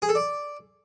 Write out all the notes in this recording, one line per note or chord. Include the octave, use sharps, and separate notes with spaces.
G#4
A4
D5